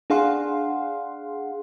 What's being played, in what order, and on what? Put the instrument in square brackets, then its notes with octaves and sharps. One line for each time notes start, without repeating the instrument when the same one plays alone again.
[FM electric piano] D4 G#4 F5 F#5 C6